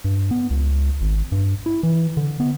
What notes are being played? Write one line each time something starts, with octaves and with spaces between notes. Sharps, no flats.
G2
B3
C#2
G#1
G2
E4
E3
D3
B3